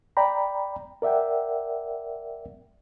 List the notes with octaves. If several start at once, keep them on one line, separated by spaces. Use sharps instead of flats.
D5 G5 A#5 B5
A#4 D5 E5 F#5 G5